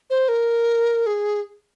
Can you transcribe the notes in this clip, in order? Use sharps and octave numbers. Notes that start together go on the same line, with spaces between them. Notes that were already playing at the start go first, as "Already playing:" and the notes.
C5
A#4
G#4